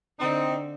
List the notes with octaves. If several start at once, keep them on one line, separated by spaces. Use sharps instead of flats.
D3 C4 D#4